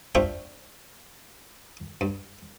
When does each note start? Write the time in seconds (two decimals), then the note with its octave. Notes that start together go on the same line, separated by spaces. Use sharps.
0.15 D4 F4 G4 C5 E5 C#6
2.01 G2